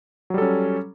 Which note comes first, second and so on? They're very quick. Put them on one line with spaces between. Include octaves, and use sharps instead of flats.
F#3 G3 A4 C#4